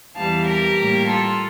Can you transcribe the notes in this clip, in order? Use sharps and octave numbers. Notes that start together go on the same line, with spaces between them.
E2 E3 G3 F5 A5
G4 A#4
A2 G3 A#3
F4 A4